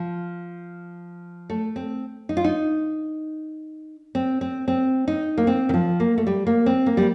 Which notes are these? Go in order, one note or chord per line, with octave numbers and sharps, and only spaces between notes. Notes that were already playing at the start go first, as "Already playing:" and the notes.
Already playing: F3
A3
C4
D#4
F4
D#4
C4
C4
C4
D#4
A#3
C4
D#3
F3
A#3
A3
G3
A#3
C4
A#3
G3